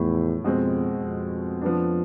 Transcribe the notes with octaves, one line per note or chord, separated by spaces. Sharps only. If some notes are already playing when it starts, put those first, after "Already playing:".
Already playing: E2 A2 F3 A3
F2 B2 G#3 C4
F2
F3 B3 D4